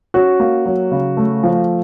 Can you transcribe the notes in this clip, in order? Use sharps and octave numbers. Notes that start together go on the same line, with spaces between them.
C#4 F#4
A#3
F#3
C#3
A3
F3